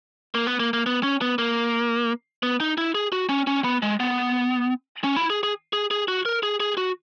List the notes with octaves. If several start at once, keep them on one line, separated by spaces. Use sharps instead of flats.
A#3
B3
A#3
A#3
B3
C#4
B3
A#3
B3
D#4
E4
G#4
F#4
C#4
C#4
B3
G#3
B3
C#4
E4
G#4
G#4
G#4
G#4
F#4
A#4
G#4
G#4
F#4